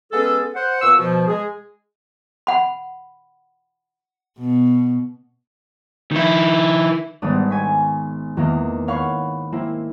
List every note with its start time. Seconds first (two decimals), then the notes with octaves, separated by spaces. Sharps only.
0.12 G#3 B3 C#4 G#4 A4
0.55 C5 F#5
0.82 A#2 B3 F#5 C#6 E6
0.97 B2 F3
1.27 G#3 G#4
2.47 F#5 B5
4.39 B2
6.12 D#3 E4
7.22 G#1 D#3 G3 B3 D4 D#6
7.50 G#5 C#6 B6
8.37 E2 D#3 A#3 A#5
8.88 C#5 F5 F#5 B5 C#6
9.52 A#3 C4 E4